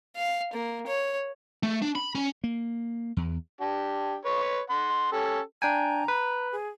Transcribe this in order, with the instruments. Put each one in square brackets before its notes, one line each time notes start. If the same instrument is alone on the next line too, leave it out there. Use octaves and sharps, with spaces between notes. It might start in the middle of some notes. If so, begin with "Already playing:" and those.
[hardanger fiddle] F5
A#3
C#5
[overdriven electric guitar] A3
D4
B5
C#4
[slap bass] A#3
E2
[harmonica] D4 G4
B4 C#5
F#5 C6
C#4 G4 A4
[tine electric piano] D4 G5 G#5 [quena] A#5
[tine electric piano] B4
[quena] G#4